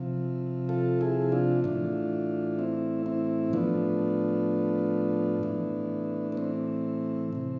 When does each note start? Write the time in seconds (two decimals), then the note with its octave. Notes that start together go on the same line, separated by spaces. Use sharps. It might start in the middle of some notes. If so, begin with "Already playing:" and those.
Already playing: C3 F3
0.69 F4 A4
1.01 E4 G#4
1.32 D4 F4
1.64 A2 E3 D4 F4
2.59 C4 E4
3.06 C4 E4
3.53 A2 F3 B3 D4
5.43 A2 E3
6.32 B3
6.37 C4
7.33 C3 E3